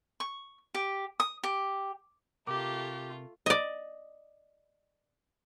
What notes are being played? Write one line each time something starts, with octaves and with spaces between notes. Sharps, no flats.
C#6
G4
D#6
G4
C3 A3 F4 G4 A#4 D6
D5 D#5